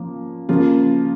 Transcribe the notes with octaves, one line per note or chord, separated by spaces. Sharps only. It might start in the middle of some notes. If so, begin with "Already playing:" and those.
Already playing: F3 A#3 C#4
C#3 F3 A#3 F4